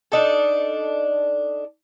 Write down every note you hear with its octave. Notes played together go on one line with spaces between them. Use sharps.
D4 D#4 A4